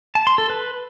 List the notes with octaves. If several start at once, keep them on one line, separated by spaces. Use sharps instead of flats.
A5
C6
A4
B4